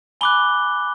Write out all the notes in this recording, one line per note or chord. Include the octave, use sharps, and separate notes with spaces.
G#5 B5 D6 F#6 G7